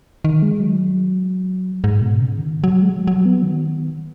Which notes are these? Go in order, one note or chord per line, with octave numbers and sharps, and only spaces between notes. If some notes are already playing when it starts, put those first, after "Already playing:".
D#3
G#3
F#3
G#2
B2
C#3
D#3
F#3
G#3
F#3
F#3
B3
D#3